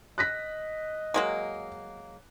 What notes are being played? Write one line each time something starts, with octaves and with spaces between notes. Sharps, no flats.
D#5 F#6 A#6 B6
F#3 G#3 A#3